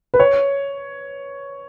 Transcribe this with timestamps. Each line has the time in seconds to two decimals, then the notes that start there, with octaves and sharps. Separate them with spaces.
0.14 B4
0.20 C#5